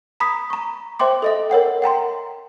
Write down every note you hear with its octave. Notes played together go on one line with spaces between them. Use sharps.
A#5 B5 D#6 B6
A#5 C#6
C5 E5 G5 C6 D6
A4 D#5 E5
A#4 C#5 F#5 G5
F#5 G5 A#5 C6